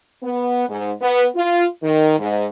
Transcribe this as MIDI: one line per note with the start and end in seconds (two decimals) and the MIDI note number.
0.23 0.67 59
0.69 0.92 44
1.01 1.26 59
1.35 1.65 65
1.83 2.18 51
2.19 2.46 44